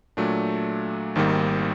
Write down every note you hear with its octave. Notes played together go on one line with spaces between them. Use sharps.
A#2 F#3 A3 D4
G#1 G#2 D#3 G3 A#3